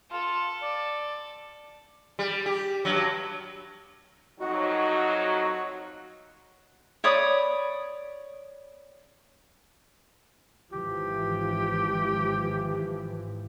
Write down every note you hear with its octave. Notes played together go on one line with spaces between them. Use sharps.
F4 A4
D5
G3
G4
G2 F#3
F2 F#3 D#4 F#4 D#5
C#5 D5 B5 D#6
G#1 E3 F3 G4